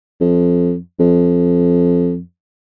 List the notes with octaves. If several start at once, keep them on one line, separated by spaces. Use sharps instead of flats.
F2
F2